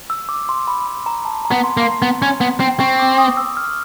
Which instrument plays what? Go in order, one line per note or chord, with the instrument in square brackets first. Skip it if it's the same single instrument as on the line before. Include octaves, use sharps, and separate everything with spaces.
[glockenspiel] E6
D6
C6
B5
B5
A#5
A5
A#5
[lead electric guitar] B3
[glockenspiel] C6
[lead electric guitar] A#3
[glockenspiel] C6
[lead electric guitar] B3
C#4
B3
C4
[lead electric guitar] C4 [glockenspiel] C#6
[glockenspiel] D6
D#6
E6
F6